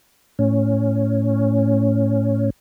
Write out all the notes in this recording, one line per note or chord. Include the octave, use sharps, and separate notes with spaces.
A2 C#4